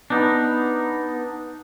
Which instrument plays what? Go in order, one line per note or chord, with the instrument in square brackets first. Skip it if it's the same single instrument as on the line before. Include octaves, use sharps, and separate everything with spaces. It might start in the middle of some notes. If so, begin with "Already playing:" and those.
[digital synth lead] B3 [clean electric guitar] D4 D#4